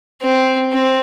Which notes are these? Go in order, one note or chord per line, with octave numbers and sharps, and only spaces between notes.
C4
C4